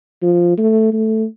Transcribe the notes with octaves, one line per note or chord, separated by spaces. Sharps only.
F3
A3
A3